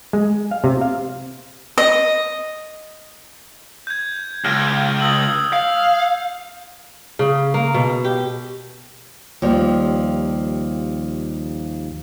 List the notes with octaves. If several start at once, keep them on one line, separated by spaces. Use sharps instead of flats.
G#3
F5
C3
F5
D#5
G6 G#6
C#2 F6
D#6 E6 F#7
F5
C#3
A#3
B2
G4
D#2 F3 G3